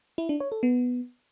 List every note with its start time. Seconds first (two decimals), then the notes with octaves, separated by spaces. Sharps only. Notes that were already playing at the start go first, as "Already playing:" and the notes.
0.18 E4
0.29 D4
0.40 C#5
0.52 A4
0.63 B3